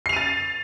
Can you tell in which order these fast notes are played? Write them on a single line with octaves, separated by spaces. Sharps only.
C7 F7 D#7 A6